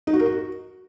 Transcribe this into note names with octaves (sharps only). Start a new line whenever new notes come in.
D#4
F#4
A#4
F#4